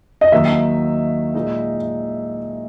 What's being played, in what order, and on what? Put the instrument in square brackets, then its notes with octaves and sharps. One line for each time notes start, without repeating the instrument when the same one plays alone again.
[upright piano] D#5
[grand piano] D#2 D#3 F#3 A#3 D#4 [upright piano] E5
[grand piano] A#2 G#3 D#4